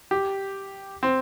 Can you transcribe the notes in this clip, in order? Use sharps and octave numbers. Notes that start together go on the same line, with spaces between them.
G4
C4